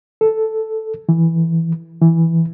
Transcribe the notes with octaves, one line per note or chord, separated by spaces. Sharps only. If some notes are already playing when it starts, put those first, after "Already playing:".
A4
E3
E3